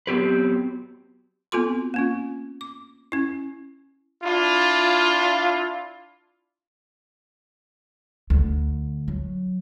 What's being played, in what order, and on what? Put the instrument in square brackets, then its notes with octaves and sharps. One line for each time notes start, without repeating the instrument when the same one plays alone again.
[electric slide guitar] F#3 B3 C4 G4 B4
[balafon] B3 C4 F4 F#4 A4 C6
A#3 C#4 F4
D6
C#4 E4
[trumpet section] D4 E4 F4
[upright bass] D2
F#3